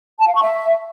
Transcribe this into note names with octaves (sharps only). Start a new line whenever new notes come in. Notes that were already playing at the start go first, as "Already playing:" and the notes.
A5
F5
C#6
E5